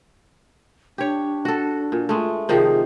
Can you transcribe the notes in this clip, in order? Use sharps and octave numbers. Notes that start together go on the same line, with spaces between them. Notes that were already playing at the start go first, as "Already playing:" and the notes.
D4 G4 C#5
F#4 A4
A#2
G#3 A3
C3 D#3 F3 G#4